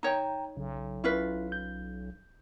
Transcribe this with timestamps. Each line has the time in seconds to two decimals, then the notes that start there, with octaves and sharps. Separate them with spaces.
0.03 D#4 C#5 G5 A#5
0.57 B1 C#3
1.04 C#4 E4 F4 B4
1.52 G6